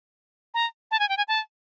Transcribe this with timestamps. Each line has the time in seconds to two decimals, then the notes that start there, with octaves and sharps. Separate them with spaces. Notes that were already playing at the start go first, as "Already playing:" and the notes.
0.54 A#5
0.91 A5
1.00 G#5
1.09 G5
1.17 G#5
1.28 A5